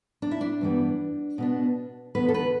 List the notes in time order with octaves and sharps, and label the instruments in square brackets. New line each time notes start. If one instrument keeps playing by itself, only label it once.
[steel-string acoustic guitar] D4
E4
D4
G2 E3 G3 B3
B2 B3 D4
E2 D3 B3 B4
A4
B4